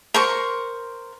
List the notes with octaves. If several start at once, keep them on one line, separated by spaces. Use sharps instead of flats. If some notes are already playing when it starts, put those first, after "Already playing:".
A#4 C5 C#6